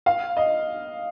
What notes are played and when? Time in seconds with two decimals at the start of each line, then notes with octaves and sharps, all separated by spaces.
0.06 F5
0.37 D#5